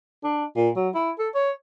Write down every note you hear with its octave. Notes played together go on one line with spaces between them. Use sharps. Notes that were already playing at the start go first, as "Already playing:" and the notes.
D4
A#2
F#3
E4
A4
C#5